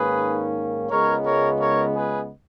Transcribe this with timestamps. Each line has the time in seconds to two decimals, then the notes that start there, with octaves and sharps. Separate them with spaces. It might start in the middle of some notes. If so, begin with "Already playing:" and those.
Already playing: G#2 D#3 A#3 C#4 G#4 B4
0.90 C#2 C#3 G#3 B3 A#4 C#5
1.26 A#4 C#5
1.60 A#4 C#5
1.96 G#4 B4